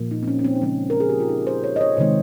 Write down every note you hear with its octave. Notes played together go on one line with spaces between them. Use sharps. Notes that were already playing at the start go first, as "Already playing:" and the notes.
Already playing: A#2 F3 A#3
D#4
C4
C#4
C#4
C4
D#4
C#3 F3 G#3 C4 C#4
A#4
G#4
G4
F4
D#4
C5
C#5
D#5
C#5
C3 D#3 G#3 C4 C5